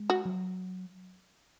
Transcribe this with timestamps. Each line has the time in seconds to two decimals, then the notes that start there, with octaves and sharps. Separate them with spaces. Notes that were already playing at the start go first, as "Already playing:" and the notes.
Already playing: G#3
0.10 F#4
0.26 F#3